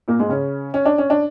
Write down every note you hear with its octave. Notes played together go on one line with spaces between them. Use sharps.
A#2 A#3
G#2 G#3
C#3 C#4
C#4
D4
C#4
D4